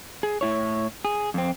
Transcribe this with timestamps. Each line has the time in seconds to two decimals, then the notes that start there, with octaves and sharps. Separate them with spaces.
0.23 G#4
0.41 A2 E4 C#5
1.05 G#4
1.34 F2 C4